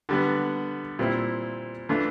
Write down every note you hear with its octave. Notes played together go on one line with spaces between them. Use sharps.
D3 G3 B3
A#2 G3 C4 E4
E3 A3 D4 F4